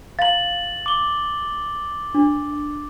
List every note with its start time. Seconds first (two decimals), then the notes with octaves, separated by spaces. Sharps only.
0.19 F5 A#5 A6 F#7
0.86 D6 G7
2.15 D4